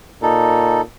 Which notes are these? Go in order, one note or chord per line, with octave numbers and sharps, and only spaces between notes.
A#2 D#4 A4